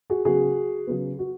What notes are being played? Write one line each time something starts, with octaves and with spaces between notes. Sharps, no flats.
F#4 G#4
C#3 F#3 B3 F#4 G#4
C#3 F#3 B3
F#4